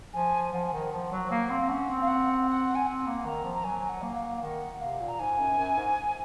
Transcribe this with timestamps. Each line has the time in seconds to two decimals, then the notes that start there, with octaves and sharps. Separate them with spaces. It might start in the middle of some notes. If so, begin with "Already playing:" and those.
0.13 F3 G#5
0.53 F3 F#5
0.63 G#5
0.73 D#3 F#5
0.92 F3
1.12 F#3
1.30 A#3 F#5
1.50 C4
1.59 F5
1.69 C#4 F#5
1.89 C4
2.01 F5
2.08 F#5
2.48 F#5
2.75 G#5
2.86 C4 F#5
3.06 A#3
3.25 D#3 A#5
3.44 F3
3.55 A#5
3.64 F#3 G#5
3.79 G#5
3.89 F#5
4.02 A#3
4.16 F5
4.41 D#3 F#5
4.80 C3 F5
5.00 A#2
5.08 A#5
5.19 G#2 G#5
5.39 F#2
5.59 F#2
5.78 G#2